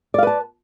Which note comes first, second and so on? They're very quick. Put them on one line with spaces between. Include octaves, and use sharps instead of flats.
D5 F5 B4 A5